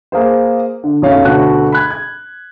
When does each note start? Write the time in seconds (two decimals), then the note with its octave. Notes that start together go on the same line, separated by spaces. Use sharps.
0.12 A#3 G#4 C5
0.83 D3
1.02 B1 F#2 A3 C#4 C#5 F5
1.25 D2 B2 A3 F#4 F#6
1.72 B5 F#6 G#6
1.90 G#6